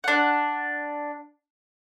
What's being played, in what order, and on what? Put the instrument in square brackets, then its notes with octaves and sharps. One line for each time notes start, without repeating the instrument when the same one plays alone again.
[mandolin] D4 F#5